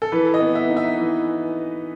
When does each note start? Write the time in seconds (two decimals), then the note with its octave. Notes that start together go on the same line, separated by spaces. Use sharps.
0.02 A4
0.12 E3 B4
0.34 D#5
0.40 B3
0.55 E5
0.70 D#4
0.77 E5
0.98 E3